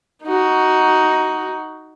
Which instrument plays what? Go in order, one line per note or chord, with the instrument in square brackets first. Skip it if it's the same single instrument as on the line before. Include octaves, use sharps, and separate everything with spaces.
[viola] D#4 F#4